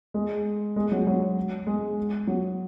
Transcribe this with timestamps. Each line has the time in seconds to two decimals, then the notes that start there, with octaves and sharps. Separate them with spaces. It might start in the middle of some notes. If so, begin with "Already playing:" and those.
0.14 G#3
0.76 G#3
0.92 F#3
1.07 F#3
1.67 G#3
2.27 F#3